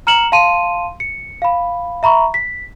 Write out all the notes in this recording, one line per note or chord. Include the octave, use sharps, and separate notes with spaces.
A#5 F6 C#7 E7 F#7
F5 A5 C6 D#7
C#7
F5 B5
E5 A#5 B5 C#6
B6